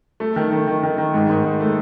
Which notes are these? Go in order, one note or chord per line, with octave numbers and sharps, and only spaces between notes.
A3
D#3
D#3
D#3
D#3
D#3
G#2
G#2
G#2
A3